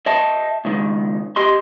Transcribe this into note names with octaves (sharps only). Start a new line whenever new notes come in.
D#5 E5 G5 A5
C#2 G#2 D#3
G4 D#5 C6